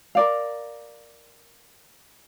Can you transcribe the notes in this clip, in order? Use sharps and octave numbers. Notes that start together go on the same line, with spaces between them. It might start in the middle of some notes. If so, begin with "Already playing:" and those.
A#4 D5 F5